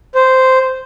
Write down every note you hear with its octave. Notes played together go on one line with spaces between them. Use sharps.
C5